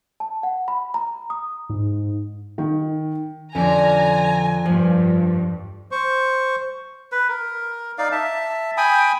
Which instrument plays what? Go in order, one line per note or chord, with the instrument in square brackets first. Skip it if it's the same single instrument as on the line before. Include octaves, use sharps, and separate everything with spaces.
[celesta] A5
F#5
B5
A#5
D#6
[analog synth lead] G#2
[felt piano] D#3
[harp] F2 D5 [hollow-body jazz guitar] D3 C#4 [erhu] G#5 [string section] A#5
[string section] G2 [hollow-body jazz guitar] F3
[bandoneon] C5 C#6
[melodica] B4
A#4
D#4 D5 F5
E5 A5
G5 G#5 B5 D#6